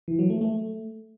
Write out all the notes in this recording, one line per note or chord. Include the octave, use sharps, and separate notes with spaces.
E3
F#3
A3
A3